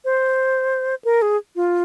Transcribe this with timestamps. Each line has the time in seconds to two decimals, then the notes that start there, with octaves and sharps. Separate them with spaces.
0.05 C5
1.05 A#4
1.22 G#4
1.56 F4